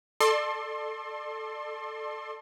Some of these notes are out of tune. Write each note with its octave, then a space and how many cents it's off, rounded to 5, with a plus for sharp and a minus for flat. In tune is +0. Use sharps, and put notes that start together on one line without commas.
A4 +0 D5 +35 C6 +30